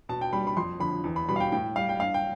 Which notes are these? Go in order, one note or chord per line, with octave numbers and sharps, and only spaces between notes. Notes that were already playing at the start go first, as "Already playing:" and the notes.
B2 A5
G5
G3 B5
B5
F2 C6
D3 F3 B5
E2
B5
B2 G3 B5
F5
G5
A2 G5
G3 F5
G5
G2 F5
G5